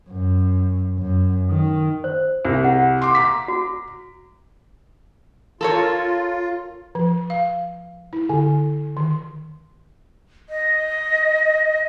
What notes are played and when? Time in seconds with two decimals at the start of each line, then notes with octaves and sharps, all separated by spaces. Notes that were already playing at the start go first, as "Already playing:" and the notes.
0.10 F#2
0.99 F#2
1.50 D#3
2.04 C5
2.45 C2
2.64 G#4 F#5
3.02 C6 D6
3.15 A#5 D6 B6
3.48 F#4
5.61 F4 A4 A#4 C#5
6.95 F3
7.30 F5
8.13 E4
8.29 D3
8.97 D#3
10.49 D#5